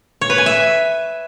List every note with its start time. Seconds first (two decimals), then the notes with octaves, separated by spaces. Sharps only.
0.21 C#5
0.30 B4
0.38 G#5
0.46 E5